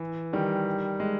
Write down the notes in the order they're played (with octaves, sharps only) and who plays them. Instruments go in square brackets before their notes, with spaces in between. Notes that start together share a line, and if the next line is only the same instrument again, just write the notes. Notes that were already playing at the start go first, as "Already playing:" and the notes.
Already playing: [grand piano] E3
D#3 G3
G#3